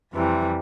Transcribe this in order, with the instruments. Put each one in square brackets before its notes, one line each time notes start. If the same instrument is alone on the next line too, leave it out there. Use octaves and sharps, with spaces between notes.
[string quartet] F2 C3 E3 G3